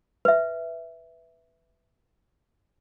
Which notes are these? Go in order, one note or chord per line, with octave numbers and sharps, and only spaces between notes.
B4 E5